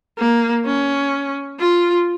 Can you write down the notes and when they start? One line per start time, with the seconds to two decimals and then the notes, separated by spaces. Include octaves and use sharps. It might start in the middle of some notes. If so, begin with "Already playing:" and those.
0.19 A#3
0.66 C#4
1.60 F4